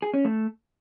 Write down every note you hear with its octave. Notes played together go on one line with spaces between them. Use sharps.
G#4
C#4
A3